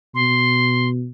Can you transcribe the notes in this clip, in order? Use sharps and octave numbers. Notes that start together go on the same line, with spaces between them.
B2 C6